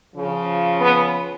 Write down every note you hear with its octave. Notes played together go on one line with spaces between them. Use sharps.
C#3 F3
B3